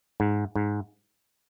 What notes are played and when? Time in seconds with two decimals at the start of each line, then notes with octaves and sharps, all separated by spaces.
0.20 G#2
0.56 G#2